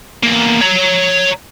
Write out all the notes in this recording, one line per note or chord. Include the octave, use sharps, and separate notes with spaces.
E2 A#3
C#5 A#5